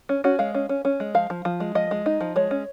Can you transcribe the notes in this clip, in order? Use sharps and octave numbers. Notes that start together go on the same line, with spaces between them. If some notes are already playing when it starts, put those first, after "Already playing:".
C#4
C#4 F#4
G#3 F5
C#4
C#4
C#4
G#3
F3 F5
F3
F3
G#3
F3 D#5
G#3
D#4
F3
G#3 C#5
C#4